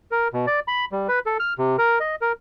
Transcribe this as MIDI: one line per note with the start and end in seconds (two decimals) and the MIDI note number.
0.11 0.28 70
0.33 0.46 47
0.47 0.60 74
0.68 0.85 83
0.92 1.07 55
1.08 1.19 71
1.26 1.37 69
1.40 1.53 89
1.59 1.76 48
1.78 1.99 70
2.00 2.16 75
2.21 2.32 70